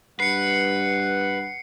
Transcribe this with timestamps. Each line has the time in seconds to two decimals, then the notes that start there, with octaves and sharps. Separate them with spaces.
0.20 G2 B4 F#5 C7 C#7